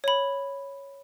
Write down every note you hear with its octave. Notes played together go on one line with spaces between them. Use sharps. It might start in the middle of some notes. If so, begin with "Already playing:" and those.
C#5 B5